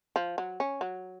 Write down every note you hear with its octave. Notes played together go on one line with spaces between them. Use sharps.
F3
F#3
C#4
F#3